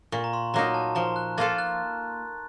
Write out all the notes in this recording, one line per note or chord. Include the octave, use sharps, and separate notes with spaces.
A#2 C#6
A#5
C6
F#3 A#3 D#4 A#5
A#5
A5
F3 A#5
F#6
A#3 F4 A4 A6
F#6